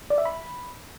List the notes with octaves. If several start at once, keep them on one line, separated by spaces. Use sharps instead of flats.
D5
E5
B5